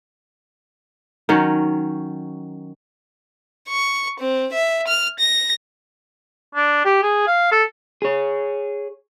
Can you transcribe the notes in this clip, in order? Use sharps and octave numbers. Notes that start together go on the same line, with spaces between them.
D#3 F#3 C#4
C#6
C4
E5
F6
A#6
D4
G4
G#4
F5
A4
G#4 C#5